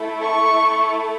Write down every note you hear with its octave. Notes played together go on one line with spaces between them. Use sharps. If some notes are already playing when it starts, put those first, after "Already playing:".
Already playing: A3 E4 A4
C#6